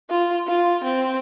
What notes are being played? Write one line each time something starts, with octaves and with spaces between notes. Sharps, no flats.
F4
F4
C4